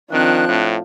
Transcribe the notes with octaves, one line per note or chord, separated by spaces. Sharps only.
D#3 F3 C4 D4 F#6
A2